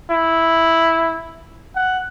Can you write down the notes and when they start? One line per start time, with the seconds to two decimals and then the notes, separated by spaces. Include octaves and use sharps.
0.11 E4
1.76 F#5